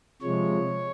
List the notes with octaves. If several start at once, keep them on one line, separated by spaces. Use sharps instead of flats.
C3 F3 G#3 C#5